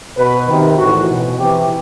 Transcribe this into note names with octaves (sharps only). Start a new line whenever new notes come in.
B2 B4
C3 D#3
A2 E3 F#4
B2
C3 E3 G4